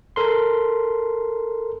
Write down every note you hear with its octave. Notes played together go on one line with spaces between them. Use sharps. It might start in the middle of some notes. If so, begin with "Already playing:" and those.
A4 A#4 C6